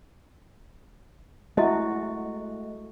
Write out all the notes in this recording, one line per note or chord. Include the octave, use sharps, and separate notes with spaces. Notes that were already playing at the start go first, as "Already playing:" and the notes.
G#3 A3 E4 F#4 D#5 E5